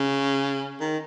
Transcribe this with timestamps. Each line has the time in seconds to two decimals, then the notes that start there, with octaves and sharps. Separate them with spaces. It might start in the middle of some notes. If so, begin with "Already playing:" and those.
Already playing: C#3
0.80 D#3